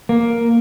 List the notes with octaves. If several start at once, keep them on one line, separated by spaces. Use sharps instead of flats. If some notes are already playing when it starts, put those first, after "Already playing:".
A#3